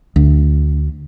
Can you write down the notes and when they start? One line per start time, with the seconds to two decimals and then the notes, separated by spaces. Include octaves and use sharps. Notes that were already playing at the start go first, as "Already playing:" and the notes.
0.16 D2